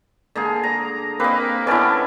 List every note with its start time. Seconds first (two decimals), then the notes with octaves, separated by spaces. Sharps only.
0.35 D3 A#3 G#4
0.63 A#5
1.20 A#3 C4 B4 D#5
1.67 D3 B3 C#4 D4 E4 D5